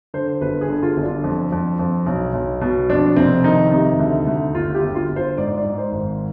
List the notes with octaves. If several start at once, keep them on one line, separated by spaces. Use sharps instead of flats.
D3 C5
G1 B4
G#4
D3
F4
G1
D4
F2
F2
F2
B1
B1
B2
F2 D4
F1 C4
D#3 D#4
C3 D#4
D2
D2
G1 F4
G4
G1
F4
G1
C5
G#2 D5
D5
G#2
C5
G#1